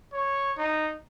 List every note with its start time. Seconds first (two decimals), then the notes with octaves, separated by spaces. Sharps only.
0.13 C#5
0.58 D#4